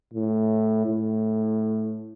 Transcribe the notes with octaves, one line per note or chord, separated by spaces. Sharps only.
A2
A2